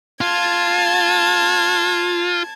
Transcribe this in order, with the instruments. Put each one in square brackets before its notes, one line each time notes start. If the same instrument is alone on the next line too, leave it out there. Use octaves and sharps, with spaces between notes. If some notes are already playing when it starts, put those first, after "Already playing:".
[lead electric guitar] F4 [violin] A5 G#6